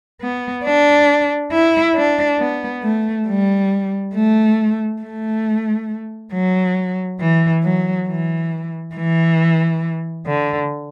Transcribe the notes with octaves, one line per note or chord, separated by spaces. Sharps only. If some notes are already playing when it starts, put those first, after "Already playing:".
B3
D4
E4
D4
B3
A3
G3
A3
A3
F#3
E3
F#3
E3
E3
D3